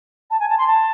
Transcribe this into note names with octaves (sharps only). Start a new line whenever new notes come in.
A5
G#5
A5
C6
A5